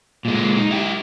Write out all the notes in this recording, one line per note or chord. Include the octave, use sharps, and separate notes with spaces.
A#2 G#3
D#4
E4 G4